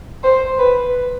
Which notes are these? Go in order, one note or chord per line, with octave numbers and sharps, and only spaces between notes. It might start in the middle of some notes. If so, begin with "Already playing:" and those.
C5
B4